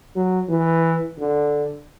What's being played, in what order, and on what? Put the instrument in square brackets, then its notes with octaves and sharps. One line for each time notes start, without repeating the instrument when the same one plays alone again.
[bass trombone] F#3
E3
D3